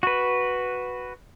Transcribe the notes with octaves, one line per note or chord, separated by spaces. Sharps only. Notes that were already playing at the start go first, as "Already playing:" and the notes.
F#4 B4